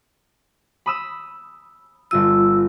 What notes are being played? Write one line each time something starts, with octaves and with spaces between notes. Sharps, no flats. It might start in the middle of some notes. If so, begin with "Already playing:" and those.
B5 D#6 E6
G1 F4 E6 D#7